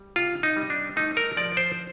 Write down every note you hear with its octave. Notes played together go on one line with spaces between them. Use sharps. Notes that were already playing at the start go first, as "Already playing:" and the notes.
Already playing: G3
C3 F4
D#4
G3
D4
A3 D#4
A#4
F3 D5
C5